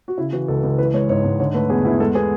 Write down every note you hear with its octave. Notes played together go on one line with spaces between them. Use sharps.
F#4
C#3 E4
E3 F#4
C#2 A4
C#2
E3 B4
G#3 C#5
G#2 C#5
G#2
D3 C#5
A3 B4
E2 G#4
E2 E4
G#3 A4
B3 G#4